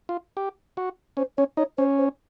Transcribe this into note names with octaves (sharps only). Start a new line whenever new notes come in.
F4
G4
F#4
C#4 C5
C#4 C#5
D#4 C#5
C#4 C5
C5